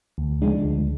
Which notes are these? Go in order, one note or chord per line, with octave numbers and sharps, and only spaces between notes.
D2
C#3 F3 G#3 D4
D2